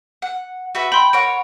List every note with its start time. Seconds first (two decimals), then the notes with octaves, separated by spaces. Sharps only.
0.22 F#5
0.75 F#4 B4 E5
0.92 G5 B5 C6
1.13 A#4 C#5 F#5 D7